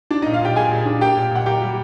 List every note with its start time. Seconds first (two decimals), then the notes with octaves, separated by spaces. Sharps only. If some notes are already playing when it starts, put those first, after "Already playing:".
0.11 D4 D5
0.22 D#4 D#5
0.26 A#2
0.34 F4 F5
0.41 A#2 G4 G5
0.56 A#2 G#4 G#5
0.71 A#2
0.86 D4
1.01 A#3 G4 G5
1.17 A#2
1.31 A#2 F#5
1.46 A#3 G4 G5
1.61 G3